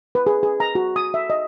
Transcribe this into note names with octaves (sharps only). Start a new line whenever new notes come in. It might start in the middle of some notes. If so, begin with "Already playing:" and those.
B4
G#4
G#4
A#5
F#4
D#6
E5
D#5